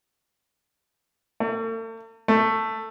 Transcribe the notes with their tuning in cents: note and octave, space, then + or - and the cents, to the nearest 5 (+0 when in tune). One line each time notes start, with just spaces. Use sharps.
A3 +45
A3 +10